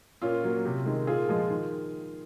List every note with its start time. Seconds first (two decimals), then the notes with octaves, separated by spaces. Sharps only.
0.22 A#2 C#4 F4
0.44 F#3 A#3
0.65 C3
0.86 D#3 G#3
1.07 A#2 F4 G#4
1.29 F3 G#3
1.50 D#3